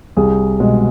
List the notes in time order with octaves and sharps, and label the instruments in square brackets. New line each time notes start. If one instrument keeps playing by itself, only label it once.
[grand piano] C2 G#4
B2 G#3